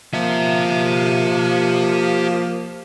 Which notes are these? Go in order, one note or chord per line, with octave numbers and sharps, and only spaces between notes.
F3 A#3 G4 E5